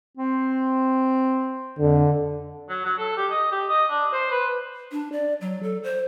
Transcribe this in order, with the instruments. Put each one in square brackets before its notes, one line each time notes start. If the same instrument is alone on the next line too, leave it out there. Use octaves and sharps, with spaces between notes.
[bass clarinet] C4
[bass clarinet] F2 [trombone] D3
[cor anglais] F#3
F#3
A4
G4
D#5
G4
D#5
D4
C5
B4
[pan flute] D4
D5
F#3
A4
C5